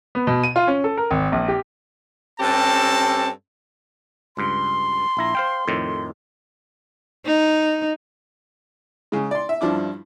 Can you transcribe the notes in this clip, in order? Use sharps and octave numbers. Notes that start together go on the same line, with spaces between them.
B3
B2
D#7
F4
C#4
A4
A#4
G#1
A#1
G4
G2 C4 C#4 G4 A4 A5
C#2 G2 C6
A#1 E4 A#5
C5 F5 G5
F2 A2 D#3
D#4
C#3 G#3
D5 C6
E5
G2 F3 D4 E4 D6